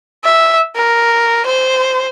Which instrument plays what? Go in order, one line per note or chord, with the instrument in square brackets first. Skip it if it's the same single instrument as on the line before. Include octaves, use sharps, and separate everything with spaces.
[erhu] E5
A#4
C5